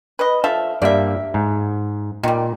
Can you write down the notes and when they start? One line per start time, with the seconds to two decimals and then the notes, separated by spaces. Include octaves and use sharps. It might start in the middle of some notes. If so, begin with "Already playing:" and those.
0.19 B4 D#5
0.44 F3 A4 E5 F5
0.82 G2 G3 A#3 D5 E5
1.34 G#2
2.23 A#2 D#3 G3